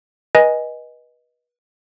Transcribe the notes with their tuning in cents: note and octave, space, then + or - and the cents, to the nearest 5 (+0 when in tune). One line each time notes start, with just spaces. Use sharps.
B4 -30 D#5 +5 G#5 +0